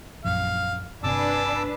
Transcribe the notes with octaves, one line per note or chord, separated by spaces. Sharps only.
A#1 F#2 F5
G1 C3 D4 B4 G#5 A5 D6 E6